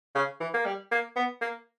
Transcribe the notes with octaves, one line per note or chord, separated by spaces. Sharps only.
C#3
E3
A#3
G3
A#3
B3
A#3